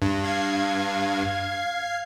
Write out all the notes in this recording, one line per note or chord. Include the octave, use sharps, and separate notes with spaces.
G2
F5 G#6 C7